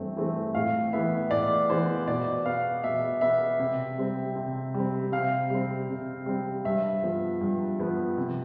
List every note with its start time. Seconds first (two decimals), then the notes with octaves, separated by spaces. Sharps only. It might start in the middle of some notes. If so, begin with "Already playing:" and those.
Already playing: G2 E3 A3 C4
0.17 E3 A3 C4
0.54 A2 F5
0.93 E3 B3 E5
1.31 A2 D5
1.69 E3 B3 C5
2.08 B2 D5
2.45 B3 F5
2.84 B2 E5
3.21 B3 E5
3.59 C3
3.98 G3 C4
4.36 C3
4.74 G3 C4
5.12 C3 F5
5.50 G3 C4
5.89 C3
6.26 G3 C4
6.65 G2 E5
7.03 F3 B3
7.41 G2
7.79 F3 B3
8.18 C3